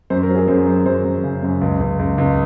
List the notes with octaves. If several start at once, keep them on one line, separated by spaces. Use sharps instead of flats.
F#2 C5
A#4
F#3
G#4
F#2 C5
F#3 C5
F#2 C5
F#2
C#3
F#2
C#2
C#2
C#2
C#2